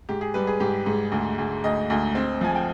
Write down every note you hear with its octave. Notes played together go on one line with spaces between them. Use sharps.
G#2 G4
G#4
G3 B4
G#4
G#2 G4
G#2
D2
D2
D2 D#5
D2
C4
F3 G#5
G5